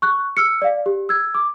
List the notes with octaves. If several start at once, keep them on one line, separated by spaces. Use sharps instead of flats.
C#6 F#6
E6 F6 C#7
D5 F5
G4
E6 G#6
D6